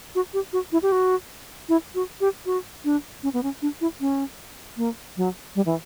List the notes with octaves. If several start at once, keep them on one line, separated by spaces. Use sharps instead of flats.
F#4
G4
F#4
E4
G4
F#4
E4
F#4
G4
F#4
D4
C#4
B3
C#4
D4
E4
C#4
A#3
F#3
G3
E3